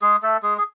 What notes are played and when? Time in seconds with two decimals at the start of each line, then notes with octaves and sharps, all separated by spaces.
0.02 G#3 G#4
0.23 A3 A4
0.43 G#3 G#4
0.58 G#4